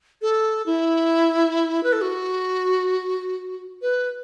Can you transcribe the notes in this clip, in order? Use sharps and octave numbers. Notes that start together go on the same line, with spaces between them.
A4
E4
B4
A4
F#4
B4